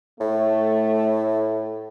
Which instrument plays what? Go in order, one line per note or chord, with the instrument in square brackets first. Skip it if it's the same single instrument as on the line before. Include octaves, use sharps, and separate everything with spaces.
[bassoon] A2 [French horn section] A3